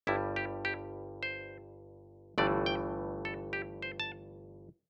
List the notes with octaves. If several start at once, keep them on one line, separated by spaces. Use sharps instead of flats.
G1 G2 G3 E4
G4
G4
C5
G1 G2 E3 A3 D5
G5
A4
G4
C5
A5